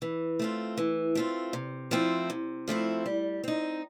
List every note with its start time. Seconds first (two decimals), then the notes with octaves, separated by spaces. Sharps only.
0.02 E3
0.39 A3 C4 F4
0.78 E3
1.15 A3 C4 F4
1.53 C3
1.91 F3 A3 C4 E4
2.30 C3
2.68 F3 A3 C4 E4
3.06 G3
3.44 C4 D#4